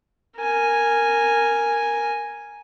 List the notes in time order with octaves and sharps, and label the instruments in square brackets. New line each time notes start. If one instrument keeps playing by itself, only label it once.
[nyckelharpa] A#4 G#5